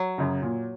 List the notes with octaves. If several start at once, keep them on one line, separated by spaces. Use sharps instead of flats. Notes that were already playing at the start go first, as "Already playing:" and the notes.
Already playing: F#3
F#2 C#3
A#2